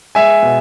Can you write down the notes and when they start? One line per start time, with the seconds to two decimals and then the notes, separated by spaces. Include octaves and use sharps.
0.15 G#3 E5 G#5
0.42 B2